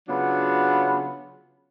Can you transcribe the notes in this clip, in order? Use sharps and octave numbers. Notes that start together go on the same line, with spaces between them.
C#3 F#3 B3 D4 F4